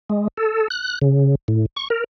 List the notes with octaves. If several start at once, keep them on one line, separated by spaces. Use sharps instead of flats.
G#3
A4
F#6
C#3
A2
C#6
A#4